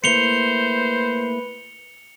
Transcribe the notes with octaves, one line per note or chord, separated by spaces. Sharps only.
A3 A#3 E4 B4 C5 C#7 F7 G7